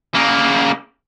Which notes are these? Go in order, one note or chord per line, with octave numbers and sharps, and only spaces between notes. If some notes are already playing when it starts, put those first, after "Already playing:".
C#3 A#3